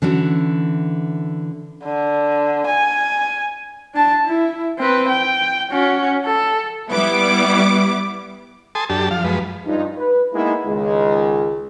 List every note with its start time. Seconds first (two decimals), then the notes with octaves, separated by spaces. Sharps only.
0.02 D3 E3 C#4 F#4
1.84 D3
2.66 G#5
3.94 D4 A5
4.26 E4
4.78 C4 B4
5.09 G5
5.72 C#4 F#4
6.26 A4
6.91 G3 B3 E4 D6
8.75 A4 G#5 A5 C6 D#6
8.90 F#2 D4 G4 A4 A5
9.11 F3 F5
9.24 F#2 F3 G#3 B4
9.66 G2 F3 D#4
9.98 B4
10.33 G#3 A#3 B3 D#4 E4
10.66 C#2 D#3 G#3